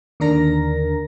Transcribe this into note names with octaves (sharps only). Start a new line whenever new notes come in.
D#2 D3 D4 A#4 A#5 A#6